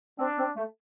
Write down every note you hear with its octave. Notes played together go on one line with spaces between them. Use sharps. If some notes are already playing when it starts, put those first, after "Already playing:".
C4 D4
C4
A3